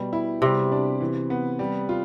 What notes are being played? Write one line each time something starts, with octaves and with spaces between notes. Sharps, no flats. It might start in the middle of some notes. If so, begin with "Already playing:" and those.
Already playing: B2 G3
E4
C3 G3
D4
E3
B3
G3
F4